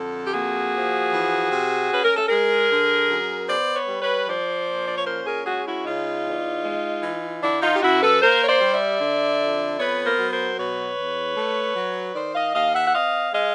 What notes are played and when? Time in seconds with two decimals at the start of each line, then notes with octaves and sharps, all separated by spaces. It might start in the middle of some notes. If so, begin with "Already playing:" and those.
Already playing: F2 D3 A4
0.26 G4
0.33 A#3 F#4 G#4
0.73 F3
1.13 E3
1.51 C3
1.91 C#4 B4
2.04 A#4
2.15 A4
2.28 G#3 G#4 A#4
2.70 D3
3.09 F#2
3.48 B3 C5 D5
3.75 B4 C#5
3.88 G3
4.01 B4 C#5
4.27 F3 C5 D5
4.66 A#2
4.86 D5
4.97 C#5
5.06 C#4 A#4 C5
5.26 G#4 A#4
5.45 G#3 F#4 G#4
5.66 E4 F#4
5.85 C#3 D#4 F4
6.25 E2
6.64 G#3
7.03 E3
7.42 D3 D4 E4
7.62 D#4 F4
7.76 G4
7.82 F#2 E4 F#4
8.02 A4 B4
8.21 A#3 A#4 C5
8.43 C#5
8.47 C5 D5
8.61 G3
8.74 D5 E5
9.01 D3
9.40 F2
9.79 B3 B4 C#5
10.05 A#4 C5
10.18 F#3
10.31 A#4 C5
10.58 B2 B4 C#5
10.98 E2
11.36 A3
11.76 F#3
12.15 D#3 C5 D5
12.35 D#5 F5
12.55 D#2 D#5 F5
12.74 E5 F#5
12.87 F#5
12.94 C4 D#5 F5
13.33 G#3 D#5 F5